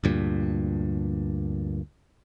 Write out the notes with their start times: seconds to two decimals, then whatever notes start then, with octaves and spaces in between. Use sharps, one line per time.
0.04 D2 G2 A#2